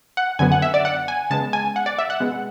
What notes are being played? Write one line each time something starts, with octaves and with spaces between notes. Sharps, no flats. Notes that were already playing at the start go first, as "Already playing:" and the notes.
F#5
F#2 D3 F#3 B3 G#5
F#5
E5
D5
F#5
G#5
C#3 G#3 B3 A5
G#5
F#5
D5
E5
F#5
B2 G#3 B3